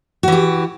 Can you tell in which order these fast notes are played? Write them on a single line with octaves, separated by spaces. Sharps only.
F#4 E3 G4